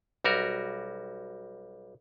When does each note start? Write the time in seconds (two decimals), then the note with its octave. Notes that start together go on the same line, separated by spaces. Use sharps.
0.24 B1 G3 F#4 A#4